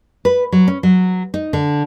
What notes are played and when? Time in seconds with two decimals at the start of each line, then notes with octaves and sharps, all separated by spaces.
0.25 B4
0.52 F#3
0.68 C#4
0.83 F#3
1.34 D#4
1.53 D3